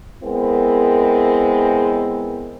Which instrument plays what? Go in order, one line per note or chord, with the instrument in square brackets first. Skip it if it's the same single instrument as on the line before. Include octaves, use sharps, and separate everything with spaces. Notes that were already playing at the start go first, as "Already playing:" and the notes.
[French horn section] G#3 B3 C4 E4 A#4